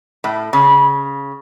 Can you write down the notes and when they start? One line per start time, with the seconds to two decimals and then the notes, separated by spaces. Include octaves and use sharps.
0.24 A2
0.53 C#3